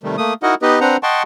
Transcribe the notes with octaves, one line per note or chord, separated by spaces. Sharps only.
C3 D#3 G3 A3
A3 A#3 D#6
D#4 E4 F#4 A#4 D#5 F#5
B3 D#4 G4 B4 D#5
C4 D4 B4 C5 F#5 A#5
D#5 F#5 G5 A5 C6 C#6